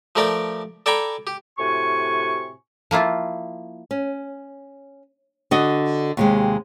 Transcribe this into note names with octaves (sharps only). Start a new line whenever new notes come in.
F3 A3 G4 A#4 D5 G5
A4 D5 G5 G#5 A#5 B5
G4
A2 C3 F#4 G#5 C#6
F3 A#3 E4 F4
C#4
D3 F#4 D#5
D#2 C3 G#3